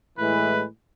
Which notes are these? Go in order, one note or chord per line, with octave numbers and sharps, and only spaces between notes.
A2 E3 G#3 B4